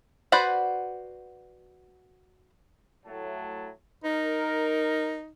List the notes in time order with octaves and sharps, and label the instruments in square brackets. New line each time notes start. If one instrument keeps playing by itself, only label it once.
[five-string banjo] F#4 B4 C5 D5 F#5
[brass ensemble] A2 F#3 A5
[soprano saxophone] D#4 [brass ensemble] A#4